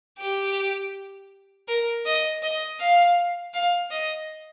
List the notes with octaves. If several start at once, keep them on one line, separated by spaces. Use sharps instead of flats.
G4
A#4
D#5
D#5
F5
F5
D#5